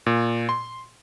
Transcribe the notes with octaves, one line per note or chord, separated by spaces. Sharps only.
A#2
C6